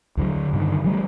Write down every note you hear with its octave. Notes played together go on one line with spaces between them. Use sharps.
D2 D3 F#3
G2 D3 D#3
E3 F#3 G3 A3